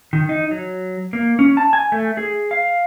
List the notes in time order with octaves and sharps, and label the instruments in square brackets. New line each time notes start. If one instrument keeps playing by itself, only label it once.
[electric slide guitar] D#3
D#4
F#3
A#3
C#4
A5
G#5
A3
G#4
F5